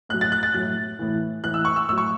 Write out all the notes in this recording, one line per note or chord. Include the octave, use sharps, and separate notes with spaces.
A2 F#3 F#6
A6
F#6
A6
A2 F#3 F#6
A2 E3
A2 E3 F#6
E6
C#6
E6
A2 F#3 E6
C#6